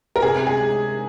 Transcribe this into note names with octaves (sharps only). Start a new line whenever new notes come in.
A#4
C3 G#4
G#3 G#4